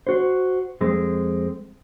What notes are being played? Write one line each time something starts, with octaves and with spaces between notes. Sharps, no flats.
F#4 C5
F2 G#3 C4